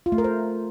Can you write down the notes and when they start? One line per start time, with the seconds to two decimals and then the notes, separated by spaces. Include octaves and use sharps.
0.06 F4
0.12 A3
0.18 A#4
0.24 C5